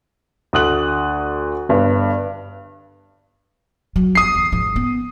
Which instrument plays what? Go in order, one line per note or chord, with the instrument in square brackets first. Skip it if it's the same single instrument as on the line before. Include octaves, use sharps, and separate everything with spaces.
[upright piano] D2 D#6 F#6 F#7
G1 G2
[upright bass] F#3
[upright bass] G1 G3 [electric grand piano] D#6 C7
[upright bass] E2
G#2 F3
B3 C#4